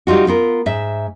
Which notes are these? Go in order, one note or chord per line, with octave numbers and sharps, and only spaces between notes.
G3 D#4 F4 F#4
B3 F4 A#4
G#2 E5